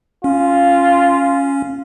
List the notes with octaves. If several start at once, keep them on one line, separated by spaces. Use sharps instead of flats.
C#4 F4